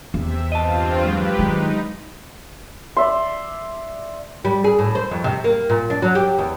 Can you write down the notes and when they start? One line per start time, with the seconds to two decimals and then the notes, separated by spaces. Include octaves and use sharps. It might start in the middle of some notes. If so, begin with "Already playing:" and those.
0.14 E2 C3 E5
0.52 G2 C4 F4 D#5 A5
1.05 F#3 G#3 G4 B4
1.39 D#3 F#3 G#3 D#4
2.97 D5 E5 C6
4.45 G3
4.64 G#4
4.79 A2
4.95 C5
5.11 F2
5.24 C3
5.44 A#3
5.70 A#2
5.90 D4
6.02 F#3
6.15 G4
6.38 E2